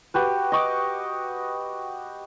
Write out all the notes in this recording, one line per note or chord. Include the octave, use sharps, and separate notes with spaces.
F#4 G4 B4
D#5 C#6 D6